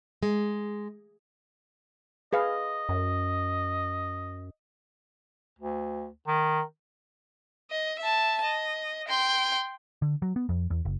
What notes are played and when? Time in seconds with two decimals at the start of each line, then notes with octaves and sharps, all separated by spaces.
0.23 G#3
2.33 G#4 B4 D#5 F5
2.89 F#2
5.59 D2
6.27 D#3
7.70 D#5
7.99 E5 A5
8.43 D#5
9.08 G5 C6
10.02 D3
10.22 F#3
10.36 B3
10.49 F2
10.70 E2
10.85 F#1